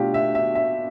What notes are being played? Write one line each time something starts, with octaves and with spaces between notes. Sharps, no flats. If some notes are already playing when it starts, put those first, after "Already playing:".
Already playing: B2 A3 D4 F4 G4
E5
E5
E5